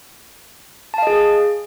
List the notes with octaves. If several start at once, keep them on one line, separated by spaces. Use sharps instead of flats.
G#4 D#5 F5 A5